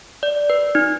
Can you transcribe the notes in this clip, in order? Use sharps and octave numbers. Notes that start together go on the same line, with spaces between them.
D5
B4
D#4